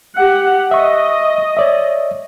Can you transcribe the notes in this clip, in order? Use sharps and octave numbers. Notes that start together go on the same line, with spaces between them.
G4 F#5
D#5 E5 C#6
C#5 D5 E5